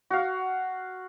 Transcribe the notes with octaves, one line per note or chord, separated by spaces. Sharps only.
F#4 F5